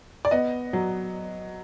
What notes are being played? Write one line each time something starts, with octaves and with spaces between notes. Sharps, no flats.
D5
B3 D#5
F#3